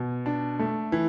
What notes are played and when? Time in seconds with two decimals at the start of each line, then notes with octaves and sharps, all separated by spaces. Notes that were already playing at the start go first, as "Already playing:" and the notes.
Already playing: B2
0.26 D4
0.59 A3
0.92 E3